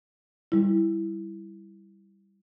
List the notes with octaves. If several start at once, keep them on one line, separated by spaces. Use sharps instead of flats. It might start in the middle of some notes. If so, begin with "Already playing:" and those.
G3 E4